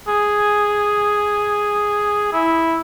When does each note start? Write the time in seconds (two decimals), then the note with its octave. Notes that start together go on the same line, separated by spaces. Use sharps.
0.08 G#4
2.33 E4